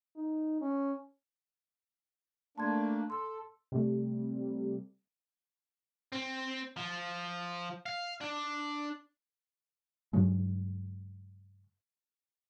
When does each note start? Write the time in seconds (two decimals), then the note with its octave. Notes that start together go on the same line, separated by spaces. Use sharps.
0.16 D#4
0.61 C#4
2.58 A3 A#3 D4 A5 C6 G#6
3.10 A4 C6 E6
3.72 C3 G3 A3
6.12 C4
6.77 F3
7.86 F5
8.21 D4
10.13 G2 C#3 F#3 G#3